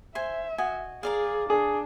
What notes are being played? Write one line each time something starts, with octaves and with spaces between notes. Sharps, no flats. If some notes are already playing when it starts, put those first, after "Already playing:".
C5 E5 G#5
F#4 D#5 G#5
G#4 A#4 D5 F5
D4 G#4